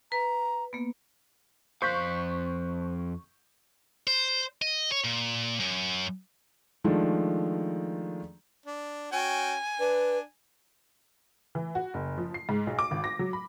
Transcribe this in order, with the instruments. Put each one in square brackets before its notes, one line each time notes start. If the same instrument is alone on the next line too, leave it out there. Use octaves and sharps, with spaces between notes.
[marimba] B4 [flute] A#5
[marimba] A#3 B3
[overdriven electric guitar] F2 F5 [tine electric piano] C5 F#6 [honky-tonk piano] C#6 G6 B6
[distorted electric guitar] C5
D#5
C#5
A#2
F#2
[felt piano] D#3 F3 G#3 A3 D4
[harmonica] D4
[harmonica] C#4 F#4 G5 [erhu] G#5
[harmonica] D4 [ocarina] B4
[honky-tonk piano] E3
F#4
F#1
F3
C7
G#2
B1
D6
G#1
A#6
F#3
B5